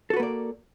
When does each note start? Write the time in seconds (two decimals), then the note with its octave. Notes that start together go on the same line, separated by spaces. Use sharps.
0.10 A4
0.13 F#4
0.17 B4
0.20 A#3
0.23 D5